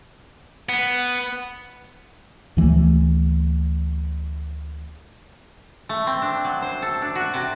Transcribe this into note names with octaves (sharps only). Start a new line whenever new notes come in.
B3
D2 E3 F3 A3
A3
C4
D4
F#3
C5
A4
D4
F#4
C3